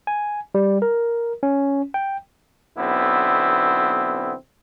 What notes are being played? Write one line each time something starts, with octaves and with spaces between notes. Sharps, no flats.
G#5
G3
A#4
C#4
G5
B1 D3 B3 C4 E4